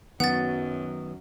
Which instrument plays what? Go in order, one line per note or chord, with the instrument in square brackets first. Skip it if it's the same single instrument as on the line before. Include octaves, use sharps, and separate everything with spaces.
[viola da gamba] F#2 [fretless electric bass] D#3 F#3 [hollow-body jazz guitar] B3 [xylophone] F#5 A6